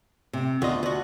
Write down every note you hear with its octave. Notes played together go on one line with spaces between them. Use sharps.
C3
D2 B3 F4 D#5
D2 F#4